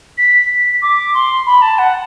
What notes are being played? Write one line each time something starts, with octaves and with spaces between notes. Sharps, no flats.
B6
D6
C6
B5
A5
F#5